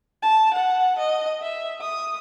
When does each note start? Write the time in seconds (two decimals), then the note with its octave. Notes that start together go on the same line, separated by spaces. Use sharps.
0.22 A5
0.54 F#5
0.98 D#5
1.42 E5
1.81 D#6